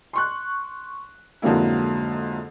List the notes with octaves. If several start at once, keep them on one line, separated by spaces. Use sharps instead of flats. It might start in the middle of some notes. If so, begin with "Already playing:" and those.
C6 C#6 F#6
F2 G#2 D3 F#3 A#3 E4